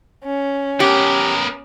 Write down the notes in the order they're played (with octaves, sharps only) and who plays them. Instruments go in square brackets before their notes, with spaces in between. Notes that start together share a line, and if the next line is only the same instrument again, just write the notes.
[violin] C#4
[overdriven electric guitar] B3 A#4 [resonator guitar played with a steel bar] G4